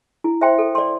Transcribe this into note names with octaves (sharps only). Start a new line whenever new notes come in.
E4
C5 E5 G5 C6
A4
D5 C6